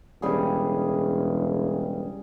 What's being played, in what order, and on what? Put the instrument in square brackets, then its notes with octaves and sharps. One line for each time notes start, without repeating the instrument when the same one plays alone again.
[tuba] E1 [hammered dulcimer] C#3 G3 G#4